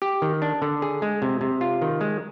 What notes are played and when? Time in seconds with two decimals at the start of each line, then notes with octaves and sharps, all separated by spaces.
0.02 G4
0.22 D#3
0.42 D4
0.62 D3
0.82 G#4
1.02 G#3
1.22 C3
1.41 C3
1.61 F4
1.82 D#3
2.01 G#3